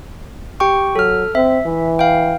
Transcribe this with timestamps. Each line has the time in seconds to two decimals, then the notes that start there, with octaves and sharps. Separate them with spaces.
0.60 G4 G5 C#6
0.96 F#3 A4 F6
1.35 C4 E5
1.66 E3
1.99 F5 G5